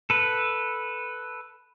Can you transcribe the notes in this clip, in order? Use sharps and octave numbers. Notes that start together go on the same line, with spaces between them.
A4 B4